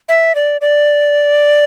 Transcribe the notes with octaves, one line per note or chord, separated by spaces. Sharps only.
E5
D5
D5